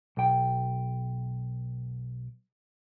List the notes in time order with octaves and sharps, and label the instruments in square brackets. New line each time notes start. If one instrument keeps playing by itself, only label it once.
[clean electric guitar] B1 G5